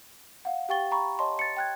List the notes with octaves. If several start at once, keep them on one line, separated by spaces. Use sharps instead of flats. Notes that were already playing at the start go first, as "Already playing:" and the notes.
F5 F#5
G4 F5 G5 C#6 A6 G7
A#5 B5 C#6
C#5 D#5 A5 C6
A6 C#7
G5 F#6 G#6